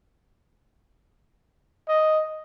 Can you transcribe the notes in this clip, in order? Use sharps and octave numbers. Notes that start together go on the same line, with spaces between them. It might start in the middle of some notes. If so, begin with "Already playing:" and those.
D#5